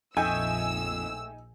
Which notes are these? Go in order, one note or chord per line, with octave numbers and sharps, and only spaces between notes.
A#1 F2 A3 D#4 D#5 G5 G#5 E6